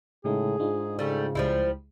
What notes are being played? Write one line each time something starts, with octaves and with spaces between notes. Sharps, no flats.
A2 C#3 G#3 D#4 G#4
G#2 D4 D#4 F4
C#3 G3 A3
C#2 F3 G3 G#3 E4